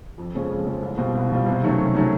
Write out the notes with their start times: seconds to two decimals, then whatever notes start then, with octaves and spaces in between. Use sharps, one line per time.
0.18 F2
0.34 C#3 F3 G#3 C#4
0.51 F2
0.66 C#3 F3 G#3 C#4
0.82 C2
0.98 B2 G3 C4 F4
1.15 C2
1.30 B2 G3 C4 F4
1.46 C3
1.62 D#3 F#3 A3 C#4
1.78 C3
1.94 D#3 F#3 A3 C#4